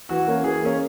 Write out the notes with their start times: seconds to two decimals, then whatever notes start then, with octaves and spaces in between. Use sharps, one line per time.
0.09 E3 F#4
0.26 A#3 C#4
0.44 E3 G#4
0.61 A#3 C#4